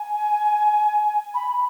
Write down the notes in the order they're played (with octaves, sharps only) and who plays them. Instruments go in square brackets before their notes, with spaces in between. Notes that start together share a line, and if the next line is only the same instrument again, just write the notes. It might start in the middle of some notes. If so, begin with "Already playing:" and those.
Already playing: [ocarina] G#5
B5